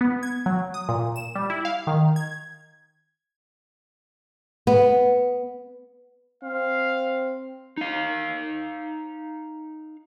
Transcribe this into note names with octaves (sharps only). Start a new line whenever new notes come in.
B3
G#6
F#3
D#6
A#2
E7
G3
E4
F5
D#3
G#6
B3
C4 F5
D#4 F5